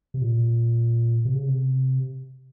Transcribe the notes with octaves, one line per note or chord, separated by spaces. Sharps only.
C3
A#2
C3
C#3
C3